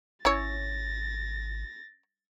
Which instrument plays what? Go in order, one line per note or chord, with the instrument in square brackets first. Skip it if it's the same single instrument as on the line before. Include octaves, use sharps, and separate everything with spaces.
[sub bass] G#1 [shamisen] C#4 E4 C#5 [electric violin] A6 A#6